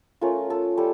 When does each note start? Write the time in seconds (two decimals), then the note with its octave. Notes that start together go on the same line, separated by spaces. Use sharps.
0.21 A3 C#4 F4 A#4
0.50 A4
0.78 G3 A4